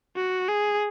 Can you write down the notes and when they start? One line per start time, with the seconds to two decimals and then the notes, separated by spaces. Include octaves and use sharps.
0.16 F#4
0.48 G#4